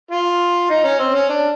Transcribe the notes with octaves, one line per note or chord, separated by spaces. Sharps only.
F4
D#4
C#4
C4
C#4
D4